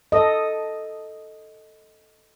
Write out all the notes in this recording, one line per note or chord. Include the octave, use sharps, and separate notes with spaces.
A4 D#5